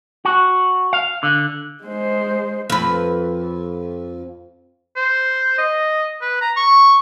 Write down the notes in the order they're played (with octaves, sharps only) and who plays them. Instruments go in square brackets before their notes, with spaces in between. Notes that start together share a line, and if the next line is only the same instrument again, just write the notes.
[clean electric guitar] F#4
F5
D3
[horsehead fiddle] G#3 C5
[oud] F2 B4
[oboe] C5
D#5
B4
A#5
C#6